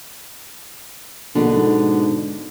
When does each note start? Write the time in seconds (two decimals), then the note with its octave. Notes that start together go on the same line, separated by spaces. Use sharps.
1.35 A#1 B2 D3
1.56 G#2